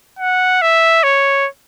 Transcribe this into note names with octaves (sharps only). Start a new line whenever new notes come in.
F#5
E5
C#5